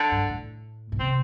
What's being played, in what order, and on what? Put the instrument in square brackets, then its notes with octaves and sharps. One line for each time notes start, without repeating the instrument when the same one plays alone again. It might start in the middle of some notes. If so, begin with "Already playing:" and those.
Already playing: [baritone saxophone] D3
[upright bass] G2
A2
A2
[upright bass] C3 [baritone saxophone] C4